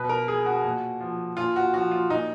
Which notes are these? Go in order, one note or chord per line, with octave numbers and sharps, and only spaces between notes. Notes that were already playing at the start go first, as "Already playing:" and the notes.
Already playing: B2 B4
A#4
G#4
F#4
A#2
F3
A#2 F4
F#4
F3 F#4
F4
A#2 D#4